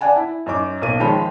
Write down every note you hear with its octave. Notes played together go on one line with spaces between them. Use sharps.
D5 F#5 G#5 A5
E4
F#2 D#4 D6
B1 A#3 D#7
D#3 F3 G#3 C#5 G5 B5